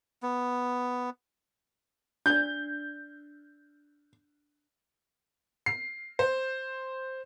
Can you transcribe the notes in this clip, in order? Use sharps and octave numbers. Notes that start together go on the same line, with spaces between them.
B3
D4 D5 G6
C7
C5